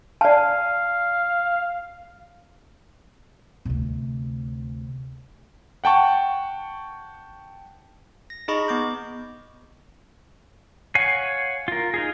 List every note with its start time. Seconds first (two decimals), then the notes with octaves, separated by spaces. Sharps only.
0.21 D5 F5 A5
3.65 D2 C3
5.84 F#5 G5 A5 C#6
8.30 A#6
8.48 D#4 G#4 D#5 B5 C#6
8.68 B3 D6 G6
10.95 C#5 F5 F#5 G#5
11.68 F4 A#4
11.94 D#4 F4 G#4